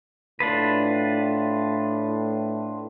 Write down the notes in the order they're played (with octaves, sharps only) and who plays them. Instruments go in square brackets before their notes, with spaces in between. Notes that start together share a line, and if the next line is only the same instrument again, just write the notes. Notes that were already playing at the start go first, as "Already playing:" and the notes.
[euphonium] A2 [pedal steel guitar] D4 F4 B4